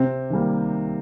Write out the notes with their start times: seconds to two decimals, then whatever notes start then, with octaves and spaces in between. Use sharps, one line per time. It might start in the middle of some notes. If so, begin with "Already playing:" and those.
Already playing: C3 C4
0.30 D#3 G3 A#3